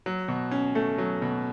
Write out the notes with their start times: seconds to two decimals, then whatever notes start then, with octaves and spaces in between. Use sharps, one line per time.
0.06 F#3
0.28 B2
0.51 C#4
0.75 A3
0.98 F#3
1.22 B2